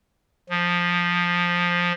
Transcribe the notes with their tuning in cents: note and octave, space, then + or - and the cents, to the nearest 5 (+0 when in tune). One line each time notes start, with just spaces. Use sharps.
F3 +10